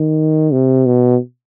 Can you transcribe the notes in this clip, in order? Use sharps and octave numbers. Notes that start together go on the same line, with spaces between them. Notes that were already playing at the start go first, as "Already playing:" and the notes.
Already playing: D#3
C3
B2